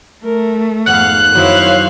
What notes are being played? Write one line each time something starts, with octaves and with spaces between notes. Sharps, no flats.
A3 A#4
G#1 F2 B3 F5 F#5 F#6
F#2 D#3 E4 F#4 C5 C#5 F5